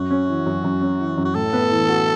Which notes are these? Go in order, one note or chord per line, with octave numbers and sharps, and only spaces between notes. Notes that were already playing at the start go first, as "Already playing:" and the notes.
Already playing: F#2 F#4
C#4
E3
F#2
F#2
C#4
E3
F#2
F#4
A2 A4
B3
E3
F#4